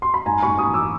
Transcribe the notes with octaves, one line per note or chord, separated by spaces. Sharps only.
C6
B5
G#2 G#5 A#5
G#2 B5 C#6
C#6 D#6
E3
D6 E6